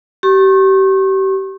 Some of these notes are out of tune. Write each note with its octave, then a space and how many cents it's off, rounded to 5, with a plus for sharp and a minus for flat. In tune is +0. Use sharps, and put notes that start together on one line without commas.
G4 -30 C#6 -40